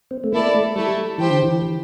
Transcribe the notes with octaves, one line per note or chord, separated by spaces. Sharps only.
C4
A3
A#3 E4 A4 D5
A3
G3 A3 E4 A4
E3 G4 C5 G5
D3
E3